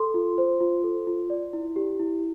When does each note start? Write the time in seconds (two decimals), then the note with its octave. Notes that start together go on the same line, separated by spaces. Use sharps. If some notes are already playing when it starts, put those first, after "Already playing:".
Already playing: A4 C6
0.14 F4
0.38 C5
0.60 F4
0.84 A4
1.07 F4
1.30 D5
1.53 E4
1.76 G4
1.99 E4